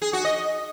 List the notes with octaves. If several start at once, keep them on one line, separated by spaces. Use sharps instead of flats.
G#4
F#4
D#5